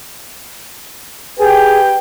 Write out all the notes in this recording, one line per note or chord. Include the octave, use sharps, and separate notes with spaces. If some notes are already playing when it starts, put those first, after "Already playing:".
G4 G#4 B4 G5